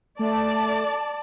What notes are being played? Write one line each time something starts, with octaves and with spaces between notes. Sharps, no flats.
A3 D5 A5